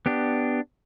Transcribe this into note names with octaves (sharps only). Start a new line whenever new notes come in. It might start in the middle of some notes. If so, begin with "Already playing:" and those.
B3 D4 G4